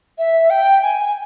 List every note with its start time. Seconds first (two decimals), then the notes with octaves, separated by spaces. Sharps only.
0.18 E5
0.50 G5
0.83 G#5